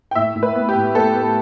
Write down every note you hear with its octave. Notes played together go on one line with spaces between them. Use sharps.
G5
A2 E5
A2
B4
B3
G4
A2
B3 A4
B3